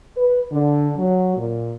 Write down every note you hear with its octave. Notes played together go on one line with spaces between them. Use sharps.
B4
D3
F#3
A#2